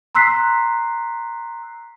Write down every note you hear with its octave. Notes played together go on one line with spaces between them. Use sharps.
A#5 C6 E6 F#6 B6 C7